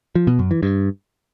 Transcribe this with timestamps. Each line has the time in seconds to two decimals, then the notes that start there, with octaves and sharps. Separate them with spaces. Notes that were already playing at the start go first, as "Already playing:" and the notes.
0.15 F3
0.27 B2
0.39 F#2
0.51 E3
0.63 G2